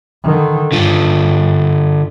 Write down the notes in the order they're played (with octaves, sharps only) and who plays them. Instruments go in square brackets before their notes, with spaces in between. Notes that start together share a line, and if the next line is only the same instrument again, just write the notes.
[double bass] D3 D#3
[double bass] G2 [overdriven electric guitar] D3 F4